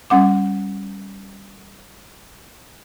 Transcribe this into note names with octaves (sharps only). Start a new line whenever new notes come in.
G3 C#4 F#5 D6